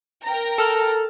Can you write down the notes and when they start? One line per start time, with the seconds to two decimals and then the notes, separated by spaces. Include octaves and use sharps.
0.24 A#4 G5 A#5
0.58 A4 F6